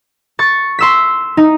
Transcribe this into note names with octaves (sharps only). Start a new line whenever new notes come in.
C#6 A6
C6 E6 B6
D#4